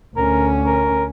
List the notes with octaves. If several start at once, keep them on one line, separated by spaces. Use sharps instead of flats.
D2 C#4 A#4
A#4